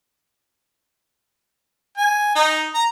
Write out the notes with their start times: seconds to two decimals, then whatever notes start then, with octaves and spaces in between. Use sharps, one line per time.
1.97 G#5
2.35 D#4
2.74 A#5